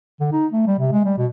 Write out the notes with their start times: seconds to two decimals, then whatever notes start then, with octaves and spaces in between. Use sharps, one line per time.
0.20 D3
0.32 D#4
0.52 A3
0.67 G3
0.78 C3
0.92 G#3
1.05 G3
1.18 B2